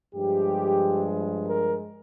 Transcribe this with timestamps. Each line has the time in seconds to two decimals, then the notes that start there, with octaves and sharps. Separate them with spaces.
0.14 G2 F3 G#3 G4
1.45 A#4